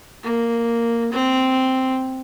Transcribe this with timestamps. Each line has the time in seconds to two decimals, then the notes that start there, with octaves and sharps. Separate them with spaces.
0.23 A#3
1.12 C4